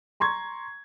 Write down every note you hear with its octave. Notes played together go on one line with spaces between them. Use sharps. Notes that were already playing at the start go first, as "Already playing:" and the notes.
A#5 C6 C#6 G#6